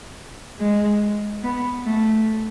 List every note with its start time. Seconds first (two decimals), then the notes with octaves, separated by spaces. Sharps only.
0.59 G#3
1.44 B3
1.86 A3